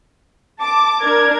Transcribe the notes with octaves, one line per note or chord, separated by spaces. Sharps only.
A5 D6
D4 A#4 G#6